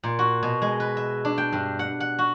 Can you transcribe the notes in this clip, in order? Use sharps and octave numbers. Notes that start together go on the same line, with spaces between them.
A#2
F#4
B2
G#3
B4
E5
D4
G5
G2
F#5
F#5
F#4